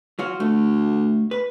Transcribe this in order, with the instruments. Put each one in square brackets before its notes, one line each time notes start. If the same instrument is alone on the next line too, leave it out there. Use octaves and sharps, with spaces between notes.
[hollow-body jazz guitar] F#3 F4 F#4
[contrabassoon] D2 [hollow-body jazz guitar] A3
[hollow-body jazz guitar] B4